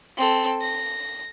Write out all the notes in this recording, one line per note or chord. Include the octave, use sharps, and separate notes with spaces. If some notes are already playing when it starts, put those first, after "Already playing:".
C4 A4
A#6